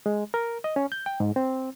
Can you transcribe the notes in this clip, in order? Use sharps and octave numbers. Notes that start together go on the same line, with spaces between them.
G#3
A#4
D#5
C#4
G6
G5
G#2
C4